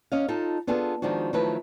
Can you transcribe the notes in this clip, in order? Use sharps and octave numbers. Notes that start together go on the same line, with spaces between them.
C#4 D#5 F5
D#4 F4 A4
B3 D4 F4 G#4 A4
D#3 F3 G#3 D4 F#4
D#3 F3 F#3 A3 E4 B4